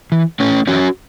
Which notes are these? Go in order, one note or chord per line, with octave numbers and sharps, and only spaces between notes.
E3
A2 A3 C#4
E3 C#4 F#4